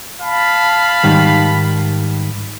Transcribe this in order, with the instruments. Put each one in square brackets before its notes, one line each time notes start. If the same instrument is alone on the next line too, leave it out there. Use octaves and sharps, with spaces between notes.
[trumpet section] F5 A5 B5
[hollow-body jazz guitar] G#2 D#3 G3